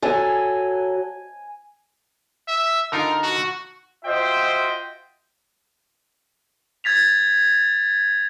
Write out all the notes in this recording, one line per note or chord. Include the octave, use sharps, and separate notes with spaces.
F#3 A4 G#5
E5
D3 D#4 F4 A#4 A#5
F#4 C#6
F4 F#4 C5 D#5 E5 G5
G#6 A6 B6 F7